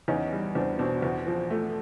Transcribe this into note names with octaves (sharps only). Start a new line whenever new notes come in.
E2 C#4 D#4
G3
E2 C4 D4
B2 C4 D4
E2
F3
A3